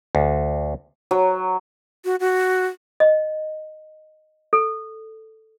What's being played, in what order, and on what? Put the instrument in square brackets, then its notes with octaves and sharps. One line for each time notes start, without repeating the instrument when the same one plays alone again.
[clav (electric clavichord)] D2
[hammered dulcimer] F#3
[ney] F#4
F#4
[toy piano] D#5
A4